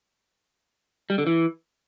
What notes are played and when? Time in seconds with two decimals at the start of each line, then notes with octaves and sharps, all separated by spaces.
1.10 G3
1.18 D3
1.27 E3